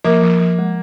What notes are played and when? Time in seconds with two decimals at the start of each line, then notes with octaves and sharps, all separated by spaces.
0.04 F3 A#3
0.22 F3
0.41 F3
0.59 G#3